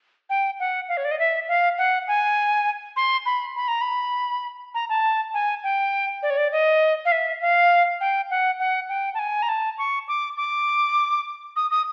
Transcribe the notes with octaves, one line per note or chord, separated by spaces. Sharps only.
G5
F#5
F5
C#5
D5
D#5
E5
F5
F#5
G#5
C6
B5
B5
A#5
B5
A#5
A5
G#5
G5
D5
C#5
D5
D#5
F5
E5
F5
G5
F#5
F#5
G5
A5
G#5
A#5
A5
C#6
D6
D6
D#6
D#6